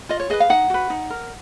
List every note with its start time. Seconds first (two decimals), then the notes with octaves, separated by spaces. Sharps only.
0.09 F4 D#5
0.20 C#5
0.30 G#4 B4 D#5
0.40 F5
0.50 D#4 F#5
0.70 F#4 B4
0.90 D#4
1.10 A#4